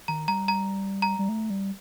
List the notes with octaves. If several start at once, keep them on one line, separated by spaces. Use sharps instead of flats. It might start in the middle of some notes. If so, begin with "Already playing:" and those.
D#3 A#5
G3 A#5
A#5
A#5
G3
A3
G3